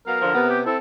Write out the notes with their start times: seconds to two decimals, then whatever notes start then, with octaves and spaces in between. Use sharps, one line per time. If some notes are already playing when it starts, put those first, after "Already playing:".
0.07 F#3 B3 A#4 F5
0.22 D3 F3
0.34 C3 B3
0.49 G4
0.65 C4 E4 A4